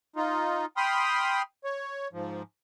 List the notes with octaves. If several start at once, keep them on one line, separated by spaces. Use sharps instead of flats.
D#4 F4
G5 B5 C6 D#6 F6
C#5
G#2 F3